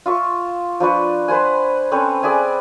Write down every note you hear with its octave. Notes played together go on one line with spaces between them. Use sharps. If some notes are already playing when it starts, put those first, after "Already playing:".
F4 E5 C#6
F3 D4 B4 C#6
B4 C5 F#5 G#5
C4 C#4 A4 B4
G#4 D5 E5 G#5